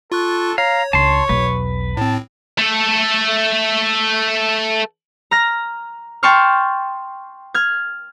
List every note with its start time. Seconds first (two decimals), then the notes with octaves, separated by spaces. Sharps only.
0.12 F4 A4 C#6 F#6
0.58 C#5 F5 A#5
0.93 C#2 D4 A5 C6 C#6
1.29 B1 E2 B4
1.97 A2 C4 A5
2.58 A3 A4
5.31 A#5 F6 A#6
6.23 G5 A5 C6 C#6 F6
7.54 F6 G#6